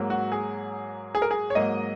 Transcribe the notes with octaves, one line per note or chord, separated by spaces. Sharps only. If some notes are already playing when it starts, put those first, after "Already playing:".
Already playing: G#2 F#3 A#3
F#4
G#4
G#4
A#4
G#4
C#5
G#2 F#3 A#3 D#5